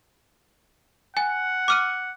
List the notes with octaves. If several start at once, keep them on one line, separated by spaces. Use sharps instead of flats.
F#5 G#5
D6 F6 D#7